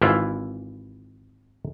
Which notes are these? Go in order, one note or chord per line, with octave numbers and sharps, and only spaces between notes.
G#1 E3 E4 F4